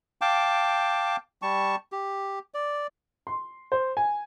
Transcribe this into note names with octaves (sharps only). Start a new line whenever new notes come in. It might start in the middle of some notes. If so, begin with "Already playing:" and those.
F5 G5 A5 D6
G3 A5 C#6
G4
D5
C6
C5
G#5